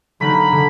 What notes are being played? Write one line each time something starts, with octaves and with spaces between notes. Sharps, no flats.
D3 F#3 A#3 D#4 G4 B5
D3